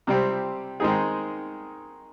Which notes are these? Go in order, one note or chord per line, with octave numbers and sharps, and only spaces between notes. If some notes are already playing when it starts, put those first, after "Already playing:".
C3 G3 C4 G4
D#3 G#3 C4 D#4 G#4